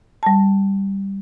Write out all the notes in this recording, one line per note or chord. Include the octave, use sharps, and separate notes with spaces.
G3 A5